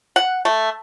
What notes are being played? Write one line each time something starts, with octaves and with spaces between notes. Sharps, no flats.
F#5
A3